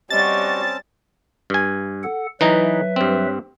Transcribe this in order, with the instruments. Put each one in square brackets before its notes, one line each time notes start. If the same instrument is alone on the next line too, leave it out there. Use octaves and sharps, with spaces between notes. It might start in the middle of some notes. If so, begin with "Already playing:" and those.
[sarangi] G3 [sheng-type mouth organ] C4 C#4 A5 [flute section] F#4 D#5 [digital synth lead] A6
[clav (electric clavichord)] G2 G#5
[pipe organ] A4 F#5
[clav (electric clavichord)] E3 D#4 A#5 [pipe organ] F#3 B4 E5
[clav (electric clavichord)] G2 C4